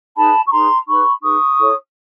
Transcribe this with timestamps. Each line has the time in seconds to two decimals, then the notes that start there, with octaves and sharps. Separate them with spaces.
0.16 D#4 G#4 B4 A5 B5
0.47 C#6
0.52 D#4 G#4 B4 A#5 C6
0.87 D#4 G#4 B4 B5 C#6
1.22 D#4 G#4 B4 C#6 D#6
1.58 E4 A4 C#5